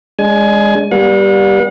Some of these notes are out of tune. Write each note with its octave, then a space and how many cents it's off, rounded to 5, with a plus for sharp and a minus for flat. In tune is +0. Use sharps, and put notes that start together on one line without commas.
G#3 -15 D4 -30 G#5 +20
G3 +0 B3 -45 F#5 -40